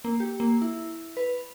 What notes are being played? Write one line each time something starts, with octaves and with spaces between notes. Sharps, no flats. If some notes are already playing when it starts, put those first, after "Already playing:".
A#3
G4
A#3
E4
B4